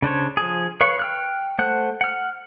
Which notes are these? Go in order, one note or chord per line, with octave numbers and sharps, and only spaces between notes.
C#3 D4 C5 C#5
F3 G#4
B4 C#5 F5 C#6
G5 F6 F#6
A3 C5 F#5 F#6
F#5 F6